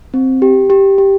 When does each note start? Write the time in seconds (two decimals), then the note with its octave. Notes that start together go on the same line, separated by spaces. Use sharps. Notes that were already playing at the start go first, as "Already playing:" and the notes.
0.14 C4
0.42 G4
0.70 G4
0.98 G4